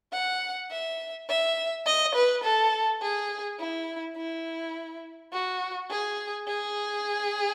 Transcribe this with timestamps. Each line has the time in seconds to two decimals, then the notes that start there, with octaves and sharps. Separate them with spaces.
0.13 F#5
0.71 E5
1.29 E5
1.86 D#5
2.15 B4
2.43 A4
3.01 G#4
3.59 E4
4.16 E4
5.33 F#4
5.90 G#4
6.47 G#4